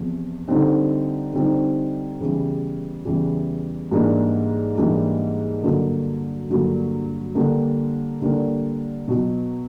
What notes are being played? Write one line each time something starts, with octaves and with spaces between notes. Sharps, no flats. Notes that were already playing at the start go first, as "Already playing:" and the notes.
Already playing: E2 C3 F3
D3 G3 C4 D#4
D3 G3 C4 D#4
E2 C#3 E3 G3
E2 C#3 E3 G3
G#2 E3 G3 A#3 D4
G#2 E3 G3 A#3 D4
G2 D3 F#3 A#3
G2 D3 F#3 A#3
D3 G3 A#3 D4
D3 G3 A#3 D4
B2 F#3 B3